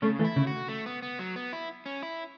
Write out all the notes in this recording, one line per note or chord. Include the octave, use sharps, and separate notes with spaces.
C#3 A3 C#4
E3 A3
E4
C#3
F#4
A3
B3
B3
F#3
B3
E4
C#4
E4